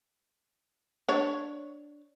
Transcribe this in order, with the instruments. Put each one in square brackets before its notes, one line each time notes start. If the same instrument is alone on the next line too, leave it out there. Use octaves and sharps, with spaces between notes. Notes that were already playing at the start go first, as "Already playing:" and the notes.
[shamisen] D4 C#5